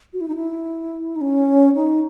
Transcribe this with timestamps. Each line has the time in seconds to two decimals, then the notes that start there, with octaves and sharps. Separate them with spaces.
0.13 F#4
0.21 E4
0.28 D#4
0.36 E4
1.16 D#4
1.21 C#4
1.75 D#4